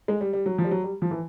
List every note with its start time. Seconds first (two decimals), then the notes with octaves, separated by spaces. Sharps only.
0.08 G#3
0.21 G3
0.33 G3
0.46 F#3
0.58 F3
0.64 G3
0.71 F#3
0.84 G3
1.02 F3
1.11 E3